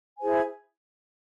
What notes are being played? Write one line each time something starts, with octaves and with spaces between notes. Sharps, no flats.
E4 G#4 C5 G#5